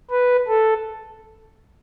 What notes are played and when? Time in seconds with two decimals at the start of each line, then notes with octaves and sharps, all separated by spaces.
0.11 B4
0.48 A4